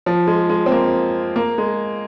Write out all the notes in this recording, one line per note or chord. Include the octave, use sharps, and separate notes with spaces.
F3
G#3
G#3
C4
A#3
A#3
G#3